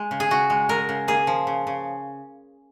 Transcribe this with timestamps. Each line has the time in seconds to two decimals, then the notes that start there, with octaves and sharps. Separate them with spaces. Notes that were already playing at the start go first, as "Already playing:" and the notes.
Already playing: G#3
0.11 C#3
0.20 G#4
0.30 C#3 F#4
0.50 G#3
0.69 G#3 A#4
0.89 C#3
1.08 A#3 G#4
1.27 F3
1.47 C#3
1.67 C#3